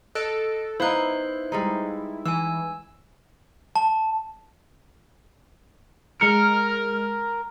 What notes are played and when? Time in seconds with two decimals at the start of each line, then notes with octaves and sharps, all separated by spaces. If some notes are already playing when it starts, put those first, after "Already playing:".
0.15 A4 D#5 F#6 D7
0.80 B3 D#4 E4 C5 F5 F#6
1.52 G3 G#3 D#4
2.26 E3 G#5 E6
3.76 A5
6.21 G#3 A#4 F6 C#7